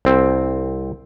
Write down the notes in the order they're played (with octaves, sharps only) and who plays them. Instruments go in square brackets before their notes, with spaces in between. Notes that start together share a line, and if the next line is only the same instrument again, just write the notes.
[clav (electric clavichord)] C2 C4